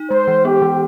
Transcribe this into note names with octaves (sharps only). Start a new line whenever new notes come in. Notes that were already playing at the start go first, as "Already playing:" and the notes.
Already playing: D#4
G#3 C5
E3
B3 G4
E3